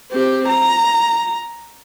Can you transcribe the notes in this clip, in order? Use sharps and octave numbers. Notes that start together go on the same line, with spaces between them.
C4 G4
A#5